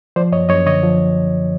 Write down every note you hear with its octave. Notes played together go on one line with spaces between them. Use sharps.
F3 C5 D5
F#2 C#5 D#5
F#2 C#5 D#5
D3 C#5 D#5
F3